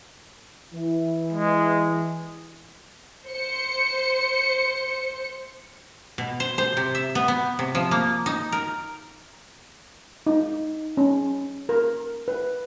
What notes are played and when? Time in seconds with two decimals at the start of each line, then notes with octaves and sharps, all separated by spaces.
0.73 E3
1.33 G#3
3.29 C5 C#7
6.18 B2
6.40 C5
6.58 C5
6.77 C3
6.95 E5
7.15 B3
7.28 B3
7.59 C3
7.75 F3
7.91 A#3
8.26 D#4
8.52 A#4
10.26 D#4
10.97 C#4
11.69 A#4
12.28 B4